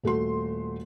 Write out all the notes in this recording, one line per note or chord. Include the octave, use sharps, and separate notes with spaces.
D#1 A3 F#4 C6